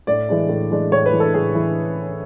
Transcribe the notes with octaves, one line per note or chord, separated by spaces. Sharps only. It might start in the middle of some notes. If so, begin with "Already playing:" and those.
A2 D5
E3 G#3 D4
A2
E3 G#3 D4
A2 C#5
B4
E3 G#3 D4
A4
A2 G#4
E3 G#3